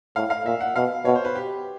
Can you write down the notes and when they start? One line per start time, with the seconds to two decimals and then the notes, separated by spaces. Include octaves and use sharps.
0.16 A2 F5
0.30 F5
0.45 A#2 E5
0.60 F#5
0.76 B2 F5
1.05 B2 C#5
1.15 C5
1.25 B4
1.35 G4